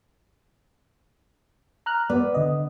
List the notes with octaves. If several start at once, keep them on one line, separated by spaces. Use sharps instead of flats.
A#5 F6 F#6
B3 D5
D3 D#5